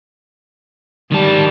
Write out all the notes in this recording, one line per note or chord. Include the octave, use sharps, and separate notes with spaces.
D#3 G3 A5